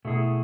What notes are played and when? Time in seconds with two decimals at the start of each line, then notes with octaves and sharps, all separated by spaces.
0.05 B2 A3 E4 G#4